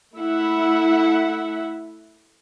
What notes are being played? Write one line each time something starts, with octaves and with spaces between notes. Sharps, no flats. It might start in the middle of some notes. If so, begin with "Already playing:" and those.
A3 E4 E5 F#5